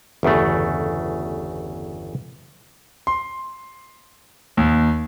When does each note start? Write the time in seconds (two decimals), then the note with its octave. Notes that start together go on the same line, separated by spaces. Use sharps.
0.23 G1 E2 C#3 A3
3.07 C6
4.57 D#2